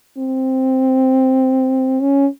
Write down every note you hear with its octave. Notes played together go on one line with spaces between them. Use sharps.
C4
C#4